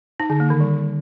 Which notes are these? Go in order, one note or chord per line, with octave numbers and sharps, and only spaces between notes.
D#4
D3
A#3
D#3
G3